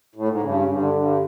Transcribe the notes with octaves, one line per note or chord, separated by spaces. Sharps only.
A2
G#2
G2 C#3
G2
D3
G2